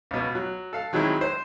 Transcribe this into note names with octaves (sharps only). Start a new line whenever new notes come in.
C#2 B2
F#3
A4 F5
D#3 F#3 G#3 C4 E4 F#4
C5